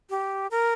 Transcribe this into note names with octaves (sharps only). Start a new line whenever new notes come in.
G4
A#4